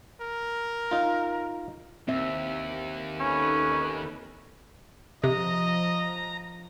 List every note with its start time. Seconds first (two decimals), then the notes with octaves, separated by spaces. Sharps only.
0.21 A#4
0.91 D#4 F4
2.08 D#2 C4 E5
3.20 C#4 D#4 A4 B4
5.24 C3 F3 D#5 A#5